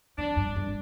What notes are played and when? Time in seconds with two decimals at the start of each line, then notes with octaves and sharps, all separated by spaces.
0.18 F3 D4
0.36 G2
0.56 G2